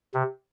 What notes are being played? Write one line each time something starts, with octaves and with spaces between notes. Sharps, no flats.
C3